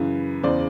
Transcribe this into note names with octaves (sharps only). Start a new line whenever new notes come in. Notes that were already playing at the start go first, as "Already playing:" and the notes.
Already playing: F#2 C#3 E3 B4
E2 C#3 E3 C5 D5